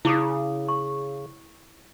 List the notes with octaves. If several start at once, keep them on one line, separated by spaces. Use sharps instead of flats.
C#3 E4 D6 D#6
C#6